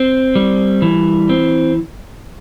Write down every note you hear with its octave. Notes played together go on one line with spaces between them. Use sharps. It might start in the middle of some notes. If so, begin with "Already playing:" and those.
Already playing: C4
G3
E3
C4